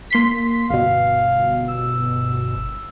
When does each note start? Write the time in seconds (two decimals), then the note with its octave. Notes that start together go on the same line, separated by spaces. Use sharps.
0.10 A#3 C6 B6
0.70 G1 B2 F5
1.68 E6